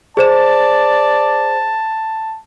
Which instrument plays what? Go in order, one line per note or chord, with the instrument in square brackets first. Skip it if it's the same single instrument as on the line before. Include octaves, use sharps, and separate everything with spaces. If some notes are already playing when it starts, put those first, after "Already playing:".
[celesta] G#4 C5 E7 [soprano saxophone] D5 [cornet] A5